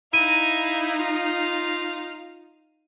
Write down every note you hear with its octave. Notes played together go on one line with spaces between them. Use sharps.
D#4 E4 F5 A#5 D#7
F4